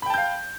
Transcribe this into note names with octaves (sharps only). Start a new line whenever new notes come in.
F5 G5 A5 B5 G6